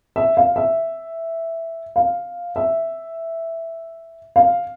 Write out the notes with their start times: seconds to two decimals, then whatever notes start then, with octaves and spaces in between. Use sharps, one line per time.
0.16 E5
0.37 F5
0.56 E5
1.96 F5
2.56 E5
4.36 F5